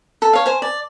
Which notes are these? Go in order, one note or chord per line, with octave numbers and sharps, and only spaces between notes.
A4
C#5 F5
C5 G#5
D5